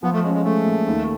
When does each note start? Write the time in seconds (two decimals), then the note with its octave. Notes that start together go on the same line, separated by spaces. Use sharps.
0.03 F3 B3
0.13 A3
0.24 G#3 C#4
0.34 G#3
0.44 G#3 A3
0.65 A#2
0.87 D#2